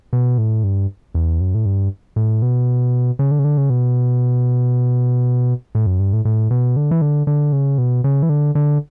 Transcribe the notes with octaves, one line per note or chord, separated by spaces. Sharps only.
B2
A2
G2
E2
F#2
A2
G2
A2
B2
C#3
D3
C#3
D3
C#3
B2
A2
F#2
G2
A2
A2
B2
D3
E3
D3
D3
C#3
B2
C#3
E3
D3
D3